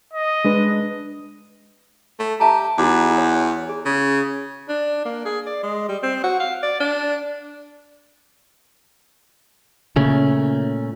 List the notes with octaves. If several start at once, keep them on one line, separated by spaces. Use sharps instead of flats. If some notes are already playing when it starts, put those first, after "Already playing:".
D#5
G#3 D4 B4
A3
G4 E5 A5 A#5
E2 E4 F#4 D6
C#5
G#4
C#3
D4
A#3
G#4
D5
G#3
G3
C4
F#4
F5
D5
D4
A#2 C#3 A3 C#4